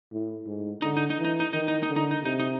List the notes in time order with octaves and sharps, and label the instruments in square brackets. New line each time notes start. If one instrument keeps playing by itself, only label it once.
[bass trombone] A2
G#2
[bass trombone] D3 [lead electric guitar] D#4
[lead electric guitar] D#4
D#4
[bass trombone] E3
[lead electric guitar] D#4
D#4
[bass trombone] D#3 [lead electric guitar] D#4
[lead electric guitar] D#4
D#4
[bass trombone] D3
[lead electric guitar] D#4
D#4
[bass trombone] C3 [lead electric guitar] D#4
[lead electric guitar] D#4